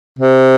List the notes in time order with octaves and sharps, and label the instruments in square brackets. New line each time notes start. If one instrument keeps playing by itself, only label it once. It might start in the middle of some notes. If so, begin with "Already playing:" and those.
[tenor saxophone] C3